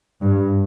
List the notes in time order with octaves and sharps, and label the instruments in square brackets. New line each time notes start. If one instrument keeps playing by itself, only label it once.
[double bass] G2